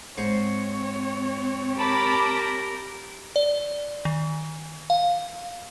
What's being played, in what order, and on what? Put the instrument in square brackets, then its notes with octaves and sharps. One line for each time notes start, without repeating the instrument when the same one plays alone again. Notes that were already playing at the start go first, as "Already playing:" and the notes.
[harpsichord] G#2 C5 C#6 [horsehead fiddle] C4 C#5
[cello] G4 A#4 [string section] A5 B5 D6
[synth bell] D5
D#3
F5